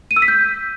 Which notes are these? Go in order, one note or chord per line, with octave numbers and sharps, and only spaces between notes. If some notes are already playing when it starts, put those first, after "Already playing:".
D#7
E6
B6
G6